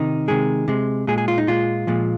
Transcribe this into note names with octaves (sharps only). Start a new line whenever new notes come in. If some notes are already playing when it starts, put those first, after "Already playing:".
Already playing: C3 D#3 D#4
C3 D#3 G#3 G#4
C3 G#3
A#2 G#3 G#4
G#4
F4
D#4
A#2 G#3 F4
A#2 F3 G#3